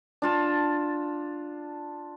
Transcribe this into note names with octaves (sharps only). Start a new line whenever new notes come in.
D4 F4 A5